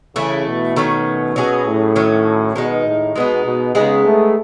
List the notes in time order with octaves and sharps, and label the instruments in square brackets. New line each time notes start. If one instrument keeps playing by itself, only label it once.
[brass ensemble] C#3 [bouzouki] E3 A3 E4
[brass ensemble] B2
[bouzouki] D#3 A3 C#4
[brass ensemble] B2 [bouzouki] F#3 C#4 G#4
[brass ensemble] A2
[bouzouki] D#3 F#3 C#4
[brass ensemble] B2 [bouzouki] D#3 G#3 D#4
[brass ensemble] A2
[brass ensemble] B2 [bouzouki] G#3 B3 D#4
[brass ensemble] B2
[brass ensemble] C#3 [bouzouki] G#3 B3 D#4 G#4
[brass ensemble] A3